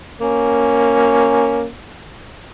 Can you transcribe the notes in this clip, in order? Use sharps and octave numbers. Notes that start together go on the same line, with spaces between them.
A#3 C#4